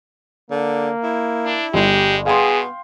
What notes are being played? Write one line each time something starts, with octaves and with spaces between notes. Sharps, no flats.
D3 A#3
E4
D4
G1 G#3 G4
B2 B3 G#4 F5 G5 C6